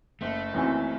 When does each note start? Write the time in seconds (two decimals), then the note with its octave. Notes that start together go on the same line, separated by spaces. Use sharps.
0.21 F#1 A3
0.53 F#2 E3 C4 F#4